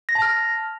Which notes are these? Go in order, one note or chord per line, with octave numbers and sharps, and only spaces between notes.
A#6
A5
F6